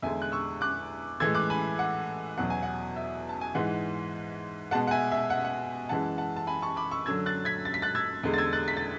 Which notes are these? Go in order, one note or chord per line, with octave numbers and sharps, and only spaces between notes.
E2 D3 G#3 E5 G#5
F#6
C#6 E6
D6 F#6
A2 E3 G#3 E6 G#6
D6 F#6
G#5 B5
F#5
E2 B2 F#3 F#5
G#5
F#5
E5
A5
G#5
G#2 E3 G#3 F#5
B2 G#3 F#5 A5
F#5
E5 G#5
E5
F#5
E5
F#5
F#2 E3 G#3 F#5 A5
F#5 A5
A5
G#5 B5
A5 C#6
B5 D6
C#6 E6
F#2 D3 F#3 E6 G#6
F#6 A6
G#6 B6
A6
B6
F#6 A6
E6 G#6
E2 D3 G#3
A6
E6 G#6
F#6 A6
B6
A6